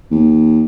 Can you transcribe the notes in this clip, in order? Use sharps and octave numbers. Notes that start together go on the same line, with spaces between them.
D#2